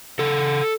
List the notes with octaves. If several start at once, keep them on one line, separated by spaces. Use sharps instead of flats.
C#3 A4